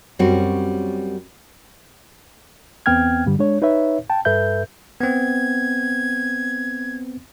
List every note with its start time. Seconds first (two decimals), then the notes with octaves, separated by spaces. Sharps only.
0.19 F#2 G3 C4 C#4 F#4
2.86 E2 B3 C4 G5 F6 G#6
3.26 G2 D3 G3
3.39 G#3 D4 C#5
3.62 D#4 B4 C#5 E5
4.10 G5 A5
4.25 G2 A4 B4 E5 G6
5.01 B3 C4 G#6